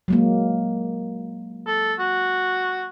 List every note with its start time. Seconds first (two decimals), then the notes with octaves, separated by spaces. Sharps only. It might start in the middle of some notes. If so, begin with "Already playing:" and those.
0.08 F#3 G#3 A#3
1.67 A4
1.99 F#4